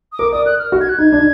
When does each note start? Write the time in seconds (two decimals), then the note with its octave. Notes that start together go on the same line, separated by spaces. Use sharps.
0.12 D#6
0.19 A#4 D6
0.32 D5 D#6
0.46 A#4 F#6
0.59 F6
0.72 F#4
0.81 G#6
0.89 F#6
0.98 D#4 G#6
1.12 D4